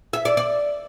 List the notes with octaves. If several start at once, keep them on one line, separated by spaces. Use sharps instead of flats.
E5
D5
D5